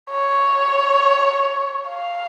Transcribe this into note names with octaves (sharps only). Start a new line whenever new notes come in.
C#5
F5